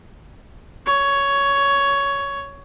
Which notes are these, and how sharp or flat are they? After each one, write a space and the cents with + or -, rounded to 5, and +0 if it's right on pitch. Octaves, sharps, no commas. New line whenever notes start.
C#5 +10